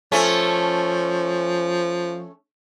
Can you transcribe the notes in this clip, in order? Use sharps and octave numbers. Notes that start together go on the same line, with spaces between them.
F3 A3 C#4